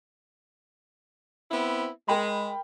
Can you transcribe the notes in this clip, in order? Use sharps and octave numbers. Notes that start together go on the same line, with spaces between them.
B3 C4 E4
G#3 A#4 G5 B5